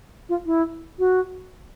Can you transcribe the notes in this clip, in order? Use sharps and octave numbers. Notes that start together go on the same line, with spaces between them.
F4
E4
F#4